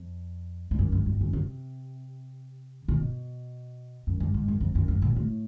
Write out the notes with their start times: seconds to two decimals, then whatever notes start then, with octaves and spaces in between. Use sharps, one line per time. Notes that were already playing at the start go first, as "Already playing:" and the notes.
Already playing: F2
0.71 G2
0.79 F#2
0.92 G2
1.06 G2
1.21 F#2
1.33 C3
2.88 A#2
2.98 B2
4.07 F#2
4.20 G2
4.34 G#2
4.48 F#2
4.61 F2
4.75 F#2
4.88 G2
5.02 A#2
5.16 A2